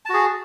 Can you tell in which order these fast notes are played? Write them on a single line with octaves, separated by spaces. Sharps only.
A5 F#4 G#4